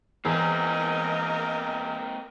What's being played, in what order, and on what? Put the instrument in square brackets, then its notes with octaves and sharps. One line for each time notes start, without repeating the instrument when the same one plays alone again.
[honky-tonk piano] E2 [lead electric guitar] A#3 C4 [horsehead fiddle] A#4 D#5